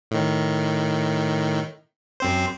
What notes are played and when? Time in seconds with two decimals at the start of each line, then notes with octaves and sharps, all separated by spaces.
0.11 A2 D#3
2.20 F#2 C4 C5